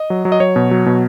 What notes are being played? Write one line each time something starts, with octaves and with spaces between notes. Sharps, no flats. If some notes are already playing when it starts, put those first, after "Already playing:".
Already playing: D#5
F#3
F#3
D#5
F#3 C#5
B2
F#3
B2